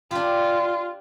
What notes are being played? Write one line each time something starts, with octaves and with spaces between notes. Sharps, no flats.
D4 F4 G4